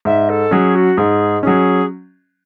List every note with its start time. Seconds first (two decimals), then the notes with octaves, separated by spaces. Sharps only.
0.05 G#2 E5
0.29 A4
0.51 F#3 C#4 G#4
0.75 F#4
0.97 G#2 G#4
1.43 F#3 C#4 G#4